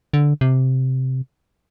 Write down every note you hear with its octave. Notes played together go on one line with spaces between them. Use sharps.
D3
C3